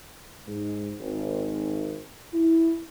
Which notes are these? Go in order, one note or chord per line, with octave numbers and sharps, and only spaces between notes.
G#2
G#1
E4